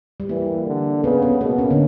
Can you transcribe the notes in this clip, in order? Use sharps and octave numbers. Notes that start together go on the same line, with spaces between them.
G3
E3 A#3
D3
C#3 B3
B3
B2 A#3
C#4
D3